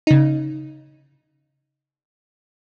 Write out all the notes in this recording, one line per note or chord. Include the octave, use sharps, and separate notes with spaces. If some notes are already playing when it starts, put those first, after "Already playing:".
C#3 D#4